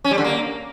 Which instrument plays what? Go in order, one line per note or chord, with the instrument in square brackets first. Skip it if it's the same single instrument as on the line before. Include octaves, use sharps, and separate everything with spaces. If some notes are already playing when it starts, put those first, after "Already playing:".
[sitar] C#4
G3
D3
A#3